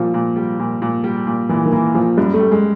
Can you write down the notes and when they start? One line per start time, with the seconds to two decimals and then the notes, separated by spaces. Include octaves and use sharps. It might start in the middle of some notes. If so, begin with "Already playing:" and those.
Already playing: A#2 F3 G3 A#3
0.14 A#2
0.36 G3
0.60 A#2
0.82 A#2
1.04 G3
1.27 A#2
1.49 A#2 E3
1.65 D#3
1.72 E3 A#3
1.94 A#2 F3
2.17 F#2 G3
2.34 A3
2.40 G3
2.52 G#3